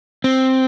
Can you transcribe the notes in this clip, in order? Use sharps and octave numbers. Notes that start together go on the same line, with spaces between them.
C4